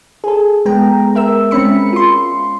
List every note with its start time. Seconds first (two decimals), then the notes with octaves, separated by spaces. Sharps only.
0.24 G#4 A4
0.66 G#3 B3 G5 A#5
1.15 A#4 E5 E6
1.51 G#3 C4 C#4 B5 C#7
1.93 F4 C6